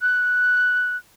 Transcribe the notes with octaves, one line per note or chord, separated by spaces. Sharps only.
F#6